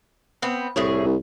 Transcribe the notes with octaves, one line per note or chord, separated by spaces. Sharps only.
B3 C4
C2 A2 G#4 C#5
C2